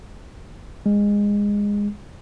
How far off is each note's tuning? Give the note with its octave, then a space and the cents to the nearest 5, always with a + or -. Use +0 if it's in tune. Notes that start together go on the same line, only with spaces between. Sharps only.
G#3 -20